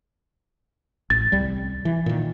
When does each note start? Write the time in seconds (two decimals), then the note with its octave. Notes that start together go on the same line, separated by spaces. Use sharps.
1.10 A1 A6
1.32 C2 G3
1.85 E3
2.06 A#2 D#3